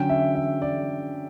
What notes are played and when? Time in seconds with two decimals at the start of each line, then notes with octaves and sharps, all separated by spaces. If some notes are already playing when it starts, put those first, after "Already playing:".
Already playing: D3 F#3 C#4 G5
0.09 E5
0.35 E5
0.62 D5